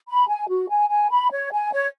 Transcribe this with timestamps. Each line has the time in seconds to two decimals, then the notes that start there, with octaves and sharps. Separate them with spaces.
0.07 B5
0.28 G#5
0.48 F#4
0.68 G#5
0.89 G#5
1.10 B5
1.30 C#5
1.51 G#5
1.72 C#5